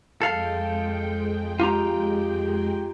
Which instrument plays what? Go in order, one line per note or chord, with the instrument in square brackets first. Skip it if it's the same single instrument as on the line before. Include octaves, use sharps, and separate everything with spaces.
[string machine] F2 G#3 G5 [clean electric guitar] A4 F5
[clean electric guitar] F4 G4 A#5